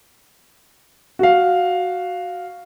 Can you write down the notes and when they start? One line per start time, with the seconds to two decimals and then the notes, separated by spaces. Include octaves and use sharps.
1.19 F#4 F5